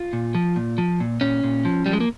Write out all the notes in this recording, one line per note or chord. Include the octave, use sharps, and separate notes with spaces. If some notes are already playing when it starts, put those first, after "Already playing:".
Already playing: F4
A#2
F3
A#2
F3
A#2
A#2 C#4
A#2
F3
F3 G3
G#3
A#3